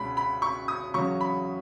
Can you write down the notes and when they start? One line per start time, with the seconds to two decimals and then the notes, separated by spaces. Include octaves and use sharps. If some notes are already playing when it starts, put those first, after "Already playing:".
Already playing: C#2 B2 G#3 B5
0.17 B5
0.42 C#6
0.68 D#6
0.94 E2 C#3 F#3 C#6
1.21 B5